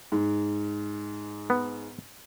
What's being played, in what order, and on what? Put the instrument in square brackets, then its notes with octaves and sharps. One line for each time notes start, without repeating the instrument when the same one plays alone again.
[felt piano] G#2
[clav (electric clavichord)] B3